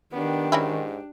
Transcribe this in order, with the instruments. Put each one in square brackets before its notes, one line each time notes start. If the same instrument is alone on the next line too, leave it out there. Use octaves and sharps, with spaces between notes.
[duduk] D#3 [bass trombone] B3 [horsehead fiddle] D4 G4
[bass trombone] G#2 [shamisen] E3 C#4 E4